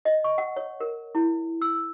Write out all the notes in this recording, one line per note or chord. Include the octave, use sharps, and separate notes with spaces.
D#5
C#6
F#5
C#5
A#4
E4
E6